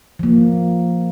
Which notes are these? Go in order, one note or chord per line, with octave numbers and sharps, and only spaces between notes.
F3 A#3